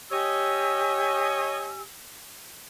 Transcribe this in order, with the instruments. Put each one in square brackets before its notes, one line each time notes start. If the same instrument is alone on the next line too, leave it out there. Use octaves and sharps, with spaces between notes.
[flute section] G4 G#5 E6 [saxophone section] C#5 D#5